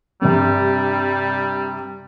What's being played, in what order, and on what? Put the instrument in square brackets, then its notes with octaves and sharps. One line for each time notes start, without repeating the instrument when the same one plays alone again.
[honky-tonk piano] G2 C3 [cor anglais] G3